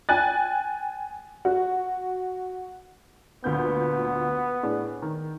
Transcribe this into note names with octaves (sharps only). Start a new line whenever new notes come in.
G5 G#5 F#6 A6
F#4
D2 A#2 B3 G6
A2 D4 G#4
D#3